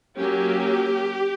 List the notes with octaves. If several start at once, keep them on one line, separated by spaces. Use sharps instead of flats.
F#3 A#3 C#4 G4